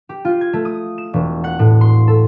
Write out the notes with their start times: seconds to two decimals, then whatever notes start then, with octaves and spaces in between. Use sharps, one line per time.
0.09 G4
0.25 F4
0.41 G#6
0.53 A3
0.65 D#6
0.98 E7
1.13 E1
1.44 F#5
1.59 A2
1.81 C6
2.08 A4